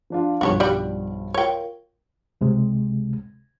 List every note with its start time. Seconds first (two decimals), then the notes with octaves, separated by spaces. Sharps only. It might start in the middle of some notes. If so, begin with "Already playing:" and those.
0.10 F3 D4 F4
0.41 B1 G2 F3 F#4 G4 C#5
0.60 G3 F#4 D5
1.34 F4 A#4 C#5 G5
2.41 C#2 C3 G#3